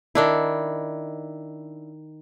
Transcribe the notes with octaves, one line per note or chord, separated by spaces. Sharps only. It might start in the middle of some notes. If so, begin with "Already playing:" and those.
D#3 D4 E4